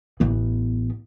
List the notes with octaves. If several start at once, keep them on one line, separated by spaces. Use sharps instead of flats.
A1 B3